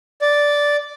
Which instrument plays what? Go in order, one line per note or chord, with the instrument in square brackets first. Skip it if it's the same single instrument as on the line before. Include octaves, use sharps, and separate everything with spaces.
[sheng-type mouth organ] D5